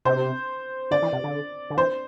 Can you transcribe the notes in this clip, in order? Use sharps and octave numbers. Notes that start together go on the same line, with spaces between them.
C3 C5
D3 D5
E3
C3
D3
D3
E3 C5